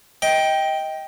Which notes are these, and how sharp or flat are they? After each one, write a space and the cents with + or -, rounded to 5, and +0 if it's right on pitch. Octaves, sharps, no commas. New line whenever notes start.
D#5 +25 G5 +0